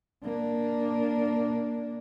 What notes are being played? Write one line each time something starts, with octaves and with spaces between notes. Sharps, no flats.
A#3 D4